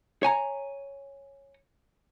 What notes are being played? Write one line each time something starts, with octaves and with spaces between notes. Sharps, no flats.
C#5 G#5 A#5